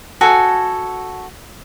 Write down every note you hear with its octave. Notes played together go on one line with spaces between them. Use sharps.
F#4 A4 G#5